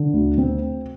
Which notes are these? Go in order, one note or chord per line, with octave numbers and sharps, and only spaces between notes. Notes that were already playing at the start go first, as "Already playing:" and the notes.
Already playing: D3
D2
C4